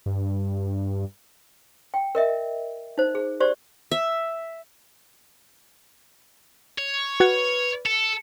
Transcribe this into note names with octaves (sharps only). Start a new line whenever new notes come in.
G2
G5
A#4 D#5 E5
D#4 C5
G#4
G4 C5 D5
E5
C#5
F#4 B4 F#5 G#6
A4 C#7 E7